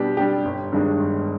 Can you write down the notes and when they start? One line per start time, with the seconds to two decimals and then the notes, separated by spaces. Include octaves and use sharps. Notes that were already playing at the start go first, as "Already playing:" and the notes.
Already playing: B2 G3 D4 G4
0.17 G3 D4 G4
0.45 G1
0.72 G2 D#3 G#3 D4
0.99 G1